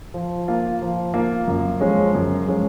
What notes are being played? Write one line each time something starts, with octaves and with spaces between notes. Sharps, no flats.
F3
A#3 F4
F3
A#3 F4
F#2
F3 G#3 C#4
F#2
F3 G#3 C#4